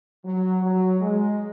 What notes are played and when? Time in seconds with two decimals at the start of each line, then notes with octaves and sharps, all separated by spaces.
0.25 F#3
0.62 F#3
1.01 G#3